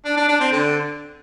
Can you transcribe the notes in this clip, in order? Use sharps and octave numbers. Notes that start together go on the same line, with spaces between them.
D4
D4
D4
C4
D3